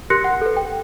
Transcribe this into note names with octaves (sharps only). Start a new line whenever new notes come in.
G4 A#4 C6 F#6 A#6 C#7
F#5
A4 B4
G5